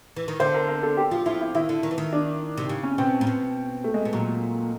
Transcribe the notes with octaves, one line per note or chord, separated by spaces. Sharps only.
E3
D#3
D3 C5
A#4
A#4
A4
G4
F3 F4
F3 E4
E4
D#3 E4
D3
D#3
E3
D#3
D4
C3
C#3
C#4
B2 C4
A#2
B2
A3
G#3
B2
A#2 F#3